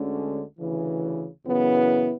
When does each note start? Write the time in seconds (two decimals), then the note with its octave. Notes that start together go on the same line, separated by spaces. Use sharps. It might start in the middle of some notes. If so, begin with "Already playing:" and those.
Already playing: D2 D3 G#3 C#4
0.59 D2 C#3 E3
1.44 F#2 C#3 E3 B3 E4